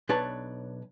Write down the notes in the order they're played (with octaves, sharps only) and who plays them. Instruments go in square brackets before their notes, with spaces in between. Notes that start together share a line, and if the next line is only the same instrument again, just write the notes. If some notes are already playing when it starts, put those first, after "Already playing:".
[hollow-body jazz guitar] B1 D4 B4 C#5 A5